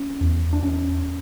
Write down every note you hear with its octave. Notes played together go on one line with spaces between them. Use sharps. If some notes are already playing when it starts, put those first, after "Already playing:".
Already playing: C#4
E2
D4
E2 C#4